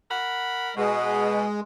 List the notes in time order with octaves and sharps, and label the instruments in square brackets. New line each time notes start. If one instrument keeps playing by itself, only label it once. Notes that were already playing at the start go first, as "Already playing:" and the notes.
[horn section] A#4 F#5 B5
[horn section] B2 [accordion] G#3